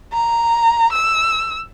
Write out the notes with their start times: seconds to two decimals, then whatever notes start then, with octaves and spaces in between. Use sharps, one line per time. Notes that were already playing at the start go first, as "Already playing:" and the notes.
0.13 A#5
0.92 E6